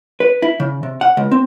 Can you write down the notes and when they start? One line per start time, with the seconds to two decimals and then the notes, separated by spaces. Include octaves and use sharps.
0.20 B4
0.42 E4
0.60 C#3
0.83 C3
1.01 F#5
1.17 C#2
1.31 C4